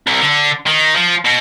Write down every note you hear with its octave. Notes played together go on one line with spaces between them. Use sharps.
C2
D3
D#3
F3
B2